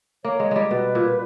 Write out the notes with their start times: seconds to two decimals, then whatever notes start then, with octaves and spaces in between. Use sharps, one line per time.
0.24 A#3 C#5
0.40 G#3
0.51 G3 G#3
0.71 B2 B4
0.95 A#2